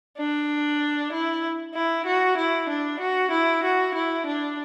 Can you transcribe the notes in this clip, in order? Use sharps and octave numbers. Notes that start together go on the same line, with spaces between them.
D4
E4
E4
F#4
E4
D4
F#4
E4
F#4
E4
D4